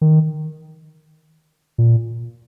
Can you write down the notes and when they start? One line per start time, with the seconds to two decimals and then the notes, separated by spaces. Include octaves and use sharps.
0.01 D#3
1.78 A#2